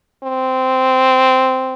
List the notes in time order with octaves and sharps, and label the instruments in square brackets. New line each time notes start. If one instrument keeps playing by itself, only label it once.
[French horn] C4